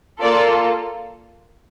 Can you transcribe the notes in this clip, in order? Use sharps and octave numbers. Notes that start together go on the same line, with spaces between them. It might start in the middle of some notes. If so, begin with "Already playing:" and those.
A#3 F4 A4 D5